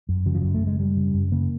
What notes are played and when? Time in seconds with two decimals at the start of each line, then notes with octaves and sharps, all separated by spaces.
0.09 F#2
0.26 C#3 F#3
0.34 F3
0.41 F#2 F#3
0.54 A3
0.61 C#3
0.67 G#3
0.79 F#2 G3
0.97 C#3
1.14 F#2
1.32 C#3 A#3